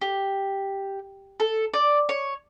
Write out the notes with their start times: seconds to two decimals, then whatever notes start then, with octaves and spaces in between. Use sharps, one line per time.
0.01 G4
1.40 A4
1.74 D5
2.09 C#5